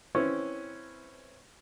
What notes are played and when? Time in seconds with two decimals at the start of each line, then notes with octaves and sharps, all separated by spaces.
0.15 C4 C#4 E4 B4 C#5